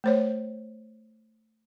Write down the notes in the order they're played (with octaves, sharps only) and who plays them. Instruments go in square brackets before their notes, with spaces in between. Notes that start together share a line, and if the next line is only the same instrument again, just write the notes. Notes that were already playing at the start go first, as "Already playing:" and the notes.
[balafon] A3 C5 C#5